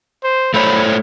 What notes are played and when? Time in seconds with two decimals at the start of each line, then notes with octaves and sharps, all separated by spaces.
0.24 C5
0.54 A3 C5 C#5 B5